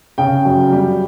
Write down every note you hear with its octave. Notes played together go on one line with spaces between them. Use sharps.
C#3 G5
F#2
G3